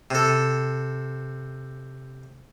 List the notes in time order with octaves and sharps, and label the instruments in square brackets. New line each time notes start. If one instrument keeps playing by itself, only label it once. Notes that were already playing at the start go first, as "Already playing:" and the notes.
[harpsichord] C3 A4